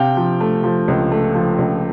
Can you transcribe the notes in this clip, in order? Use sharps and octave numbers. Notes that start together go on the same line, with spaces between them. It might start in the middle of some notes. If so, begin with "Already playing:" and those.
Already playing: C3 F5 G5
F3
A3
F3
C#2
A3
F3
C#2